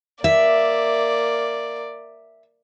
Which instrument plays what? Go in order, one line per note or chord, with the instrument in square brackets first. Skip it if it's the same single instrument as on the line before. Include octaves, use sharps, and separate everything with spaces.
[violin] A#3 D5 [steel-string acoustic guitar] E5